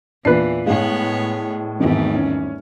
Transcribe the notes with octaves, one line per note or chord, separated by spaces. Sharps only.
E2 A#2 E3 D4 B4 C7
A2 G#3 B3 G#4 C#5 F5
G#1 E2 G#2 G3 A3
C#4